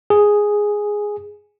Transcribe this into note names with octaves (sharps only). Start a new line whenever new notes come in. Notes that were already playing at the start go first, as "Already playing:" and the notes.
G#4